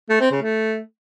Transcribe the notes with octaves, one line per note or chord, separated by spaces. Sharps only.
A3
C4
C#3
A3